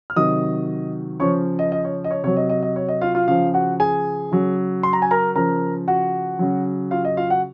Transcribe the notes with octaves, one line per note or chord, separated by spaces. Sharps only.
F6
C3 D#3 F#3 D#5 D#6
C#3 F3 C#5 C#6
D#5
D#5
C#5
D#5
C#5
C3 F#3 C#5
D#5
D#5
D#5
C#5
D#5
F4 F5
F4 F5
C#3 F3 F4 F5
F#4 F#5
G#4 G#5
C#3 F#3
C6
A#5
G#5
A#4 A#5
C#3 F3 A#4 A#5
F#4 F#5
C#3 F#3
F4 F5
D#5
F4 F5
F#4 F#5